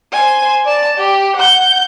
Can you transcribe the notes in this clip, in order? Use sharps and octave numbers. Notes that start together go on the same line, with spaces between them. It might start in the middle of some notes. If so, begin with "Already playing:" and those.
C5 G#5
D5 A5
G4
F#5 G6